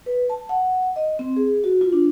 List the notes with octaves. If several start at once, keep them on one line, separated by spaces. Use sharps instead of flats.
B4
A5
F#5
D#5
C4
G#4
F#4
F4
D4